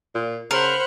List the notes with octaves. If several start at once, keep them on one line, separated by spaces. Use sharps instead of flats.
A#2
C#3 A#4 C5 F#5 B5